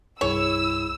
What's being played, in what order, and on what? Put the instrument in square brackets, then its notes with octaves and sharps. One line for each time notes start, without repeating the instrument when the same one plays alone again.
[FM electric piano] C2 G2 G#4 [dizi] E4 [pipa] C#5 [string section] E6